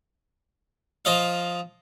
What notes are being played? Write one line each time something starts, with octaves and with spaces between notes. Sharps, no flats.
F3 D#5 F5